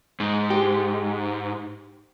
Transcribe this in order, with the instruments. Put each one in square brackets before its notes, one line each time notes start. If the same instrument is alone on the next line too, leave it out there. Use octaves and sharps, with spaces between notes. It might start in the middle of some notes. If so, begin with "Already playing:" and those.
[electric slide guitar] G#2
[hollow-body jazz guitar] G4